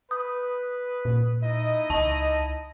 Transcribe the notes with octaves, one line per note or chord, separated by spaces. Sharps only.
B4 D#6
A#2
D#4 E4 D#5
C#2 A5